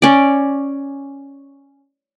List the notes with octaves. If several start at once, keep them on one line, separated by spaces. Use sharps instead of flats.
C#4 D5